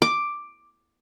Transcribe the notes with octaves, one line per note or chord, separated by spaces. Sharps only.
D6